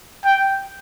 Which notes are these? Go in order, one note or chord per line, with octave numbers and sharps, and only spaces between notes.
G5